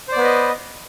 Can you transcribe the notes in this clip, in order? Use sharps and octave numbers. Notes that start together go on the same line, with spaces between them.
B3 B4 C5 D5 D#5